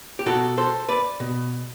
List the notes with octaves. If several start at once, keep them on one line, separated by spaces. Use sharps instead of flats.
G4
B2 F#4 A4
A4 C5
B4 D5
B2